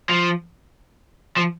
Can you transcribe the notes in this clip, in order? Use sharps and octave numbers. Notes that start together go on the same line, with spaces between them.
F3
F3